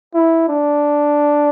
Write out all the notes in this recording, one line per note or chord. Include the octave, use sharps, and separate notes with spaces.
E4
D4